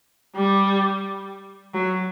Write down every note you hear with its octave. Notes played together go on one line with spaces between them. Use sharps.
G3
F#3